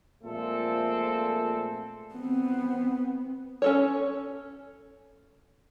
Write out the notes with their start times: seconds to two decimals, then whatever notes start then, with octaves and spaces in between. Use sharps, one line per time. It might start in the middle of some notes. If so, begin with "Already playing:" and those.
0.23 A#2 F3 G#3 A3 C4 A4
2.15 B3 C4
3.62 C#4 A4 C#5